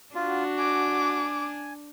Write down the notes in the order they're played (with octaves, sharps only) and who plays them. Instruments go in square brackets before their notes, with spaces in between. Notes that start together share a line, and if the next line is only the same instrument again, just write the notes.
[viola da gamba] D4 [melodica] F4 [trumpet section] F#4
[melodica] G#5 [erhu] D6